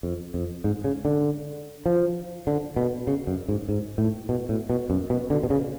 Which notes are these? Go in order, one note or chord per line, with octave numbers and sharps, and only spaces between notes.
F2
F2
G#2
C#3
D3
F3
D3
B2
C#3
F#2
G#2
G#2
A2
B2
A2
B2
F#2
B2
D3
B2
C#3